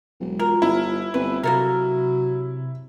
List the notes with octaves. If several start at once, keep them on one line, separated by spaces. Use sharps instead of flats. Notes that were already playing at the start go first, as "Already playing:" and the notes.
E1 F#3
F4 A#4
G1 E4
G1 C4 B4
C3 F#3 A#3 A4 A#4